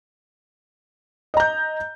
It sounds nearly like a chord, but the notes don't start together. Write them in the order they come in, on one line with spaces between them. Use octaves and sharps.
D#5 A#5 G6